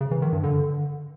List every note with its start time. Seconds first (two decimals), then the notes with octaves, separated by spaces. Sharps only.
0.01 C#3
0.11 E3
0.22 D#3
0.33 G2
0.43 D3